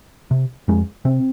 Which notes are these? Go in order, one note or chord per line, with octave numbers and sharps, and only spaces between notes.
C3
F2 G#3
C3 C4